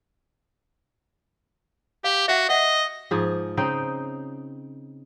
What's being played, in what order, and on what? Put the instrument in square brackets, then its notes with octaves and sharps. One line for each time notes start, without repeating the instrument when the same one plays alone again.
[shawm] G4 [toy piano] F5
[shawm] F#4 [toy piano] E5 F#5
[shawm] D#5 [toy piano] E5 F#5
[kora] G#2 F3 G#4
C#3 C4 D#4 G5